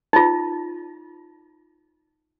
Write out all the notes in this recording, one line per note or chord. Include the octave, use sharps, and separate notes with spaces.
D#4 F4